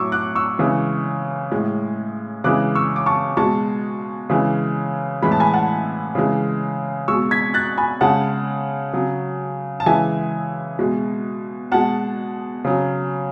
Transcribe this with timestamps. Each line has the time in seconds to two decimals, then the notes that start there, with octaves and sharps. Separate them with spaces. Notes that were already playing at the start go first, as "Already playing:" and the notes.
Already playing: A2 F#3 C#6 D6 E6
0.12 D6 F#6
0.35 C#6 E6
0.59 C#3 E3 G#3
1.52 A2 G#3
2.44 C#3 E3 G#3 D6 F#6
2.75 C#6 E6
2.96 D6
3.06 A5 C#6
3.37 B2 G#3 A5 C#6
4.30 C#3 E3 G#3
5.22 A2 E3 G#3 B5
5.32 A5
5.40 G#5 B5
5.54 F#5 A5
6.15 C#3 E3 G#3
7.08 B2 G#3 C#6 E6
7.31 G#6 B6
7.54 F#6 A6
7.78 G#5 B5
8.01 C#3 G#3 F#5 A5
8.93 C#3 F#3
9.80 A5
9.86 C#3 E3 G#3 E5 G#5
10.79 B2 G#3
11.72 B2 G#3 F#5 A5
12.65 C#3 F#3